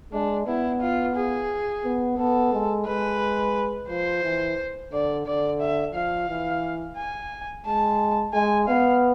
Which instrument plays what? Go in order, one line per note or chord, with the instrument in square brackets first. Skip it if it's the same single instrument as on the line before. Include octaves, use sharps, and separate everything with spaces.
[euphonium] G#3 [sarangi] D4
[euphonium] B3 [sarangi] E4
[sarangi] F4
G#4
[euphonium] B3
[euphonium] B3 [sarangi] A4
[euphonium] G#3
[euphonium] G#3 [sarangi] B4
[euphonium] F3 [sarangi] C5
[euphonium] E3
[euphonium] D3 [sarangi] D5
[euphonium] D3 [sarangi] D5
[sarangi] E5
[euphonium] F3 [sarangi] F5
[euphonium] E3
[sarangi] G#5
[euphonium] G#3 [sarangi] A5
[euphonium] G#3 [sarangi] G#5
[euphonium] B3 [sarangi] F5